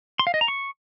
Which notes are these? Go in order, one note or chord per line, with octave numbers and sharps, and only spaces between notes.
C6
F5
D#5
A#5
C#6